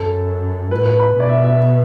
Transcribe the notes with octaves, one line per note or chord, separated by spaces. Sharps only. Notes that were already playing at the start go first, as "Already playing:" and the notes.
Already playing: F#2 A4
A2 B4
B4
B5
B2
D5
E5
E5